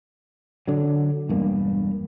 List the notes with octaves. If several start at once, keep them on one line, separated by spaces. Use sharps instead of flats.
D3 F#3
E1 G2 A#3